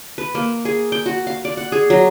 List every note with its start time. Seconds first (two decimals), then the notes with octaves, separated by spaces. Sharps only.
0.18 B4
0.35 A#3
0.65 G#4
0.92 G5
1.06 F#4
1.27 F5
1.45 D5
1.57 F#5
1.72 G#4
1.90 F#3